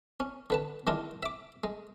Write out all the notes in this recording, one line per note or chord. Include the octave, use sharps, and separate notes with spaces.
C#4
D3 B4 A5
D#3 G#3 D4 E4 F4
E5 D6
G#3